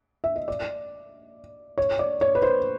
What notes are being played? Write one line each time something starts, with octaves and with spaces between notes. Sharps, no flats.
E5
D#5
D5
C#5
D5
C#5
B4
C5